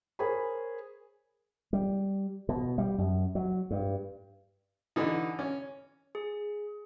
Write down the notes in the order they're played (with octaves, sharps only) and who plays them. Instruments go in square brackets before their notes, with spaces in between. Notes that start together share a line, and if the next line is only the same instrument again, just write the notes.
[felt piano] G#4 A#4 C5 C#5 B5
[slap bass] G3
B2
G3
F#2
F#3
G2
[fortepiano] D3 E3 D#4
C#4
[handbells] G#4